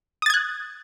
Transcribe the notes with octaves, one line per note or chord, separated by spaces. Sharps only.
D#6 F#6 G#6 A6